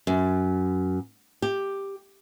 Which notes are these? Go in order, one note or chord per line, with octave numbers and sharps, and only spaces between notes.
F#2
G4